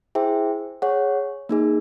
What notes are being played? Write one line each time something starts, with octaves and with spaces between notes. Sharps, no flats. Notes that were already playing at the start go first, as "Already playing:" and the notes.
E4 G#4 C5 E5 G5
G#4 C#5 F#5
A#3 D#4 G#4